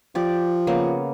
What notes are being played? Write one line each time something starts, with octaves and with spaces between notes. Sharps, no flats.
F3 G4 D5
C#3 A#3 B3